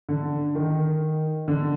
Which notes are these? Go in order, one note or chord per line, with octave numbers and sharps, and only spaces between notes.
D3
D#3
D3